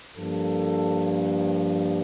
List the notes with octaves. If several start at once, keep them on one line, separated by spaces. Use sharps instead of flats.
G2 F3 A#3 A4